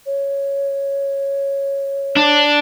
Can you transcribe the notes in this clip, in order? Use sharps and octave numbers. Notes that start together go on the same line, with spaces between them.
C#5
D4